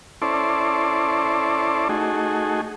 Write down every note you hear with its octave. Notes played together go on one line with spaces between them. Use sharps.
C#4 E4 A4 C5 D5
A3 D#4 F#4 G#4